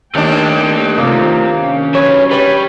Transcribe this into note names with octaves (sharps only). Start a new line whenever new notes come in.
D#2 A3 D4 D#5 G5
C3 A#3 F4
C#4
F#3 B4 C#5
G3 B4 C#5